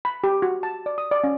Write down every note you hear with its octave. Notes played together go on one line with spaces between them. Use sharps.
B5
G4
F#4
A5
D5
D#6
D5
C#4